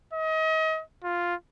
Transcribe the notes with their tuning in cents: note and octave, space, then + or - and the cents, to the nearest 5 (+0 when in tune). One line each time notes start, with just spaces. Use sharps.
D#5 +35
F4 +0